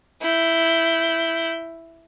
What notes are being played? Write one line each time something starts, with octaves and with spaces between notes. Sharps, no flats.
E4 G6